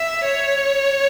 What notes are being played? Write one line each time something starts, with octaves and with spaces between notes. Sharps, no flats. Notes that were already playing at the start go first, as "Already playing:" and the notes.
Already playing: E5
C#5